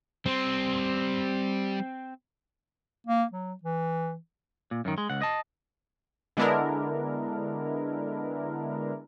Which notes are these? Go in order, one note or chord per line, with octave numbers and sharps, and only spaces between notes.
G3 C4 C6
A#3
F#3
E3
A#2
F#2 D#3
G#3
C#2 F#5
D#5 A5
D3 G#3 B3 D4 E4 A#4